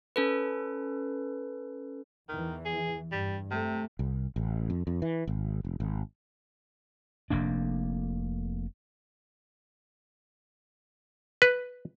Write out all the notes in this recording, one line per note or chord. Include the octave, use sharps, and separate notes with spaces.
C#4 A4 B4
E2 D#3 E3
G#4
G2 G3
C3 A3
C2
A1
F2
F2
E3
G#1
F1
G#1
F1 F2 A#3 D4
B4